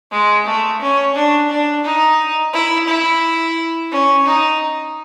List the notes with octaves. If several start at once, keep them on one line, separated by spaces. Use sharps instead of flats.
G#3
A3
C#4
D4
D4
D#4
E4
E4
C#4
D#4